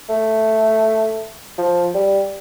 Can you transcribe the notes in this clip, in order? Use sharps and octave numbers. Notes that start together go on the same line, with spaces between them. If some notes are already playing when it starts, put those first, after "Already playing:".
A3
F3
G3